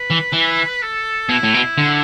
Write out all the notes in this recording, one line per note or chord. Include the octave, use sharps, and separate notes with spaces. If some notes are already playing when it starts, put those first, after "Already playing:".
Already playing: B4
E3
E3
A4
B2 E4
A2
B2
D3